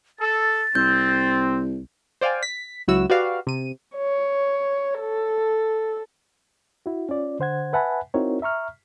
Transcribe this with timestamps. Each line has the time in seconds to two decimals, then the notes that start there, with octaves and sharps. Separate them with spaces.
0.19 A4 A6
0.75 C2 C4 G6
2.21 C5 D5 F5 G5 G#5
2.43 B6
2.88 C#2 F#3 E4 F#4 E6
3.10 F#4 G4 B4 D5 F5
3.47 C3 D#7
3.97 C#5
5.01 A4
6.86 E4 F#4
7.09 C#4 F4 D5
7.40 D3 C5 F#5 G#6
7.73 B4 E5 F#5 G#5 A5 B5
8.14 C4 D#4 E4 F#4 A#4 C#5
8.42 E5 A#5 C#6 F6